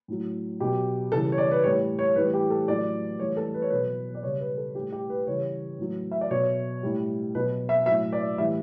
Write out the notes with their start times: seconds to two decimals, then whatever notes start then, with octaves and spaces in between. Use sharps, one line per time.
0.08 A2 F#3
0.60 B2 F#3 G4
1.12 C#3 E3 G3 A4
1.32 C#5
1.38 D5
1.51 B4
1.64 A2 G3 C#5
1.99 C#5
2.16 A2 E3 G3 B4
2.34 G4
2.50 A4
2.67 A2 F#3 D5
3.19 A2 E3 G3 C#5
3.37 A4
3.54 B4
3.62 C#5
3.70 B2 F#3 B4
4.15 D5
4.23 C#3 G3 C#5
4.40 B4
4.58 A4
4.75 G3 G4
4.79 A2
4.92 G4
5.10 B4
5.27 C#3 E3 G3 C#5
5.78 A2 F#3
6.11 E5
6.21 D5
6.30 B2 F#3 C#5
6.83 A2 G3
7.35 B2 F#3 B4
7.69 E5
7.86 A2 F#3 E5
8.13 D5
8.38 A2 E3 G3 E5